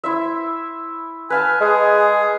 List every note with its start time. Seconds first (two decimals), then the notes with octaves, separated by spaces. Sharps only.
0.04 E4 C5 E5
1.30 B4 F5 G#5 A5
1.61 G#3 G#4